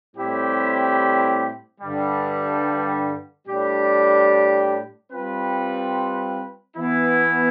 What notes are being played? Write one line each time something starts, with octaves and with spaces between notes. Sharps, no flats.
A2 G3 C4 E4 G4
G2 D3 G3
A2 G3 D4 G4
G3 C4 F4 B4
E3 B3 E4